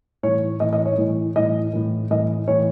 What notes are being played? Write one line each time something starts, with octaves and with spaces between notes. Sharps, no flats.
A2 E3 C#5
A2 E3 D#5
D#5
C#5
A2 E3
A2 E3 D#5
A2 E3
A2 E3 D#5
A2 E3 C#5